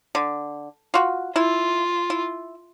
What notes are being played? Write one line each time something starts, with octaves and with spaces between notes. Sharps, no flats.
D3
F4 F#4
E4 F4
E4